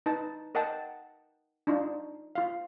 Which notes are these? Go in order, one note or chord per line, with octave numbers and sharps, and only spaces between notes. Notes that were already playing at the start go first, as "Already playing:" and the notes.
D#4 B4 A5
A#4 D#5 F#5 G5 A5
D4 D#4 F4
F4 F5